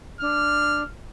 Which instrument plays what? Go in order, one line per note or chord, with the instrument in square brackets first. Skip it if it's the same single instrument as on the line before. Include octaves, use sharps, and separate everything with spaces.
[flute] D4 [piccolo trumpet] F6